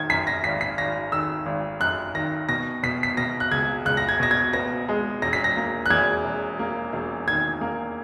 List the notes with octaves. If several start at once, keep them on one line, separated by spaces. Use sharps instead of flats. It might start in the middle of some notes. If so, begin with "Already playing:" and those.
Already playing: D#3 G#6
F#2 B6
A#6
G#1 B6
B6
G#1 A#6
D#3 E6
G#1
F#2 F#6
D#3 A#6
B2 A#6
B2 B6
B6
B2 A#6
F#6
C#2 G#6
C#2 F#6
A#6
G#6
B2 A#6
G#6
B3 A#6
G#3
E1 A#6
B6
A#6
A#3
F#6
E2 G#6
E1
A#3
E1
D#3 G#6
A#3